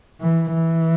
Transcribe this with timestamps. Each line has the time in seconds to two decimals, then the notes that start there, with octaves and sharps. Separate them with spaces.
0.21 E3
0.52 E3